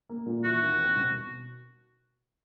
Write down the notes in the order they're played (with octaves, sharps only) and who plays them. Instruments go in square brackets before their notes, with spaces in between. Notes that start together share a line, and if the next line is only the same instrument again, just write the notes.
[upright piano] A#3
A#2
[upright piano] E3 [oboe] F#4
[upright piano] D#2
C4
B2